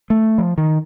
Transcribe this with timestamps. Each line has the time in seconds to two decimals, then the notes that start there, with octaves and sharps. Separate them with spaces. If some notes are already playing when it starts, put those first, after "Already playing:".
0.10 A3
0.38 F3
0.58 D#3